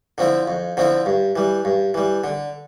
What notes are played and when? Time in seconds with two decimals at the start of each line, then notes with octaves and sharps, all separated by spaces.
0.18 D3 F3 C4 E4
0.48 F2
0.77 D3 F3 C4 E4
1.06 G2
1.36 E3 G3
1.65 G2
1.94 E3 G3
2.24 D3